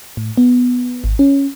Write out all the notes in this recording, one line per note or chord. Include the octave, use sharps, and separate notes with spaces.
A2
B3
G#1
C#4